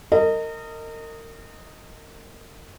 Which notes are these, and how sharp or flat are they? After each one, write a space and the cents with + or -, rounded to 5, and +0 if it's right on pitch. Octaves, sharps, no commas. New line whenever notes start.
A#4 -35 D#5 +0